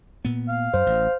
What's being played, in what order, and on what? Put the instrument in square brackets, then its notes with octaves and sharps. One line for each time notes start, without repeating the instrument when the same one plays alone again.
[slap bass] A#2 B3
[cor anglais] F5
[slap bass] F#2 [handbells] C5
[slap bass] A1